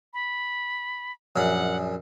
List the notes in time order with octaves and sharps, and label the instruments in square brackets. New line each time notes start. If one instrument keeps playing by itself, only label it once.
[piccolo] B5
[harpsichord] A#1 F#2 C#4 [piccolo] F#5